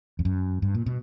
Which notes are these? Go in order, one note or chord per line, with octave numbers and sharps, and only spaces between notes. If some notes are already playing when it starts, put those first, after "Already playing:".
F2
F#2
G2
A#2
B2